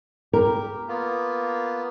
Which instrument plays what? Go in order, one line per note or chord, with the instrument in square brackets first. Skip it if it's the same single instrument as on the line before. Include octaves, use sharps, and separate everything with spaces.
[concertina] G4 [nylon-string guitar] A#4
[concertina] A#3 B3 F4